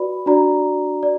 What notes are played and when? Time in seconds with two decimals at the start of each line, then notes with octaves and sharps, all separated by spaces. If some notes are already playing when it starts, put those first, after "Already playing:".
Already playing: F#4 B4 D5 B5
0.26 D4 F#4 D5 A#5
1.03 D5